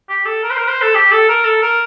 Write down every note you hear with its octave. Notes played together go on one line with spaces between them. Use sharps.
G4
A4
A#4
C5
A#4
C5
A4
G4
A4
A#4
A4
A#4